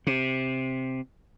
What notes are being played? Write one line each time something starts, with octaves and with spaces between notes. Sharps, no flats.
C3